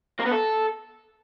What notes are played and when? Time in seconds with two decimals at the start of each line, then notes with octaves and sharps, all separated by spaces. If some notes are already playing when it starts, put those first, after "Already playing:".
0.20 A#3
0.26 B3
0.32 A4